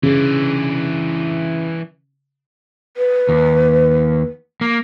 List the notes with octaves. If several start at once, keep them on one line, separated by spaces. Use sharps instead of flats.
C#3 E3 D4
B4
D#2
A#3